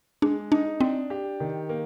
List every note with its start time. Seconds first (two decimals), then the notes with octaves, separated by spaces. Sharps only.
0.22 G#3 D4
0.51 D4 D#4
0.81 C4 D4
1.10 G4
1.40 D#3
1.69 A#3